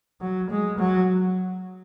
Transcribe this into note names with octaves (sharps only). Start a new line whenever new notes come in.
F#3
G#3
F#3